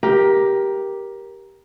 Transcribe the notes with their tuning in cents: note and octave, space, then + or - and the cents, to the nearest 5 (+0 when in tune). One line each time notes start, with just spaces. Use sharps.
G4 +0 A#4 +15